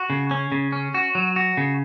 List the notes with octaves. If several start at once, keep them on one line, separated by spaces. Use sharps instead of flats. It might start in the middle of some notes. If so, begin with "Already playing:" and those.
Already playing: F#4
C#3
C#4
C#3
C#4
F#4
F#3
F#4
C#3